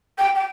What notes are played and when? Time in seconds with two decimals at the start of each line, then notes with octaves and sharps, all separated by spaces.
0.18 G5
0.35 G5